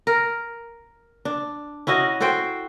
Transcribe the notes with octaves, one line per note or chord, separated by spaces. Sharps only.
A#4
D4
C#4 E4 F#4 D#5
F#4 A4 C5 G5